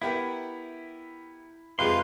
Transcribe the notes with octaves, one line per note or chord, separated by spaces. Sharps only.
B3 E4 G4 A#4
F2 C3 F3 G#3 G#4 B4 F5 C6